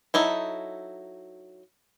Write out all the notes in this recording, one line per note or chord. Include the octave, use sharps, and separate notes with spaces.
F#3 D#4 E4 A4